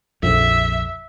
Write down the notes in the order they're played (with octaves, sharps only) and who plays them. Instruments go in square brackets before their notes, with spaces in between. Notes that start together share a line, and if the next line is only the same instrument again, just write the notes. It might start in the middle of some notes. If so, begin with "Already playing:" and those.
[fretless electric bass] A#1 F2 [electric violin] E5